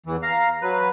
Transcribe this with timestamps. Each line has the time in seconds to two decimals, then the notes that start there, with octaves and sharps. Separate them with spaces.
0.06 E2 E3
0.23 F5 A#5
0.62 F#3 B4